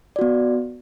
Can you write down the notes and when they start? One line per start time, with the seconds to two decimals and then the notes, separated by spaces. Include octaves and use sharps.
0.16 D5
0.19 F#4
0.21 B3